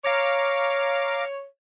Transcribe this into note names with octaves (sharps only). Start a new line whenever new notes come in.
C#5 F5 A#5 D6